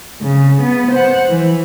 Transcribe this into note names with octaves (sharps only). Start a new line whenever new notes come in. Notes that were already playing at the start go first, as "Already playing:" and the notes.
C#3
B3
C5 F#5
E3